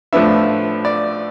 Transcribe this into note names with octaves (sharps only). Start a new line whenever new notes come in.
A2 F3 B3 D4 E5
D5